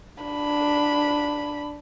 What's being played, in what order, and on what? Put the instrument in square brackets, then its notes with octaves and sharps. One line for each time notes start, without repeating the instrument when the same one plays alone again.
[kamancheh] D4 B5